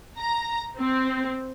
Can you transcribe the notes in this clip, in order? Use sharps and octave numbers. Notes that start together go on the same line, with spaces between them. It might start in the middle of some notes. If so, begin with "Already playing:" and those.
A#5
C4